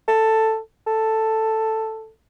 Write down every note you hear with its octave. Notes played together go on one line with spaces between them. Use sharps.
A4
A4